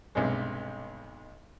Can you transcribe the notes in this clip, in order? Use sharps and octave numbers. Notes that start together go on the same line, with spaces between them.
B1 G2 C3 G#3